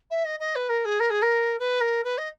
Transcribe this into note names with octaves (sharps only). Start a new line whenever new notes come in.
E5
D#5
D#5
B4
A#4
G#4
A#4
G#4
A#4
B4
A#4
B4
D#5